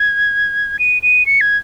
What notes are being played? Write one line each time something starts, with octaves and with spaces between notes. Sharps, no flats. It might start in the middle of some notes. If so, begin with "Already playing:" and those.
Already playing: G#6
D#7
D#7
C#7
G#6